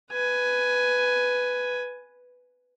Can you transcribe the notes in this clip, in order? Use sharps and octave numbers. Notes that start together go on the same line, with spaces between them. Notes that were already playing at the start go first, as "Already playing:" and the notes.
B4 G#5